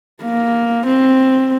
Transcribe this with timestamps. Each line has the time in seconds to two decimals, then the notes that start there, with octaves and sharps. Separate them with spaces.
0.22 A#3
0.87 C4